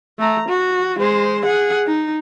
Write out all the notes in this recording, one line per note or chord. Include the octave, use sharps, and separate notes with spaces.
A3 A#5
F#4
G#3 C5
G#4 F#5
D#4